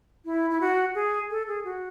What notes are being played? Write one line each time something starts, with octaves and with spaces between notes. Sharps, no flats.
E4
E4
F#4
G#4
A4
G#4
F#4